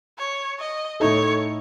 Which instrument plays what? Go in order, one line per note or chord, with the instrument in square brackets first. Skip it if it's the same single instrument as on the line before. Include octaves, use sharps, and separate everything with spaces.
[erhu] C#5
D#5
[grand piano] A2 A3 D#4 A4 [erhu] C#5